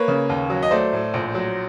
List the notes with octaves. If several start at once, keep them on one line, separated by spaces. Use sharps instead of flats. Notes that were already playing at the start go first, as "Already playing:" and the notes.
Already playing: A#3 B4 C#5
C#3
D#2
F#3
D#5
A3 C5 D5
A2
A#1
F#3